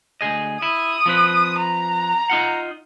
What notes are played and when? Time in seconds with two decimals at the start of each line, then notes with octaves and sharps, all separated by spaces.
0.21 D2 G#4 D#5
0.62 E4 D#6
1.06 F3 C4 B4
1.60 A#5
2.30 D#4 F4 F#5